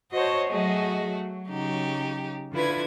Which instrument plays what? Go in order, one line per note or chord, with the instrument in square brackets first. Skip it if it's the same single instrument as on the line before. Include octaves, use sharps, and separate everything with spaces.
[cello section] F#4 C5 C#5 [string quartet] D#5 A5
[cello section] F#3 G#4 D#5 [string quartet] A3 F#4
[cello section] F#3
[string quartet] C#3 D#4 G4
[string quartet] D3 E4 G#6 [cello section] F4 B4